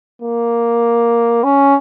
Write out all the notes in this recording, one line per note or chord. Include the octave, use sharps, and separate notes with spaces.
A#3
C#4